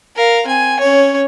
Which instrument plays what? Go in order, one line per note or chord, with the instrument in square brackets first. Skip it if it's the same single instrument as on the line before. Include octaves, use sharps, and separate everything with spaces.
[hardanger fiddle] A#4 F5
C4 G#5
C#4 C#5